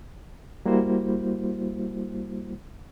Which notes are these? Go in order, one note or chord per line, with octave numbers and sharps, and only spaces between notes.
G3 A#3 E4 F#4 C5